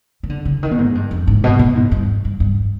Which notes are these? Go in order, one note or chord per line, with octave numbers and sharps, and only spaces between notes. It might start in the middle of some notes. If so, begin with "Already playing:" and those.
D#3
D3
D3
D#3
B2
G#2
G2
F2
G#2
B2
B2
G#2
G2
G2
G2